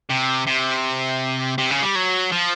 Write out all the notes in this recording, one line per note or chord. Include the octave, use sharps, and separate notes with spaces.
C3
C3
C3
C#3
G3
F#3
F3